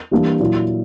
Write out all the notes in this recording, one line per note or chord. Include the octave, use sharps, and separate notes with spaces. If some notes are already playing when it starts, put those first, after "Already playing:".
E3 G3 A#3 D4
A#2 F#3 A#3 E4